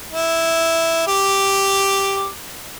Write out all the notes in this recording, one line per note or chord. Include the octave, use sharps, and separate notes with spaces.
E4
G4 D6